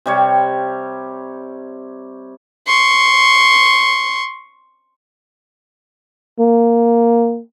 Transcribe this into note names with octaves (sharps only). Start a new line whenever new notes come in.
C3 G3 C#5
C6 C#6
A#3